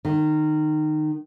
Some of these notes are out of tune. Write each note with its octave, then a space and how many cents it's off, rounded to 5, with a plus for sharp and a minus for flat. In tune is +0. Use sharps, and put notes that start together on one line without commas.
D#3 -20